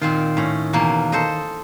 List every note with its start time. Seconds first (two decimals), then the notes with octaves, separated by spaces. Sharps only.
0.02 A#2 D#3 C4 F4
0.37 A2 C#4
0.73 E2 B2 A#3
1.12 A4 C5 D#5